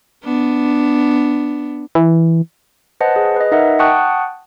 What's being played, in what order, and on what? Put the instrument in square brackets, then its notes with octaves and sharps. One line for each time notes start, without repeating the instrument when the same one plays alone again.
[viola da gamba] B3 D4
[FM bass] E3
[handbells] B4 C5 D#5 F#5 A5
G#4
B4 D#5
D#4 A#4 D#5 E5 F#5
F#5 G5 A5 C#6 D#6 F#6